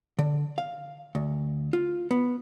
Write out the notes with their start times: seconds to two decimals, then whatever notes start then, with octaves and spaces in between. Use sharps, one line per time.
0.19 D3
0.58 F5
1.15 D2
1.73 F4
2.11 B3